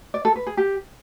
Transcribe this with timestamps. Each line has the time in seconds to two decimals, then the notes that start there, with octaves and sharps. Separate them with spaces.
0.14 D5
0.25 A4
0.36 B4
0.47 G#4
0.57 G4